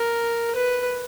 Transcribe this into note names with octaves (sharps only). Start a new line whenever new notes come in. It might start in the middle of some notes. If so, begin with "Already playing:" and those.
Already playing: A#4
B4